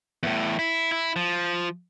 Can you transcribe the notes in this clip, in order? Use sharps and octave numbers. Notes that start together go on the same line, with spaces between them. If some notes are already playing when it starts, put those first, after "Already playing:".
E2 A2
E4
E4
F3